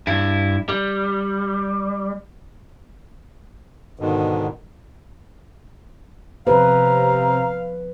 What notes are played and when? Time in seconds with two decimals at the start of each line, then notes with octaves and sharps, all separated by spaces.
0.07 G2 E4
0.69 G3
3.99 G#2 B2 D3 D#3
6.47 C3 F3 B4 F5 A#5